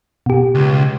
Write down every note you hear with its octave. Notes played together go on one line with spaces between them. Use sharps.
B2 G4
C#2